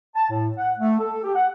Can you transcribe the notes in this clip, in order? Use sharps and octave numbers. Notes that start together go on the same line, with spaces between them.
A5
A2
F#5
A3
A4
G4
F#5